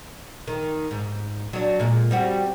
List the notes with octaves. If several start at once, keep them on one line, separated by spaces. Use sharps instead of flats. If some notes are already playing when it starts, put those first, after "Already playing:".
D#3
G#2
F#3 D4
A#2 G#3
G3 C4 F#4